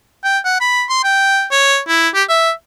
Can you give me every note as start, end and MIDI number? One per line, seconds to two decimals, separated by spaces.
0.24 0.38 79
0.45 0.57 78
0.60 0.84 83
0.89 1.00 84
1.04 1.46 79
1.51 1.79 73
1.88 2.09 64
2.14 2.23 67
2.29 2.51 76